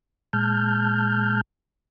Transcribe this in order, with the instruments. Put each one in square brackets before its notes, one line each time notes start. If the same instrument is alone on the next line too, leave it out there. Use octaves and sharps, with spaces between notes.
[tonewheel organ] A#2 G#3 A5 F6 G6